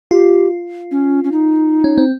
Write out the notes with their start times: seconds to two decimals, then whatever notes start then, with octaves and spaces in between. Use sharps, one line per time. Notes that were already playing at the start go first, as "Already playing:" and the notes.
0.11 F4 G4
0.91 C#4
1.24 C#4
1.32 D#4
1.84 C#4
1.98 C4